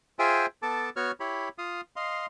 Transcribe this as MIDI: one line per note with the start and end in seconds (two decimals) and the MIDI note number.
0.19 0.46 65
0.19 0.46 68
0.19 0.46 72
0.19 0.46 76
0.19 0.46 79
0.19 0.46 80
0.62 0.90 59
0.62 0.90 69
0.62 0.90 81
0.62 0.90 86
0.96 1.11 59
0.96 1.11 66
0.96 1.11 73
0.96 1.11 85
0.96 1.11 89
1.20 1.49 64
1.20 1.49 67
1.20 1.49 73
1.20 1.49 83
1.58 1.81 65
1.58 1.81 77
1.58 1.81 87
1.96 2.26 75
1.96 2.26 77
1.96 2.26 84